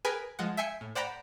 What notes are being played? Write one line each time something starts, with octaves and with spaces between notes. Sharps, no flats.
G#4 A#4 B4 G5 G#5
F3 G#3 F#5
E5 G5 G#5 C7 C#7
A2
C5 D5 F#5 G5 A#5 B5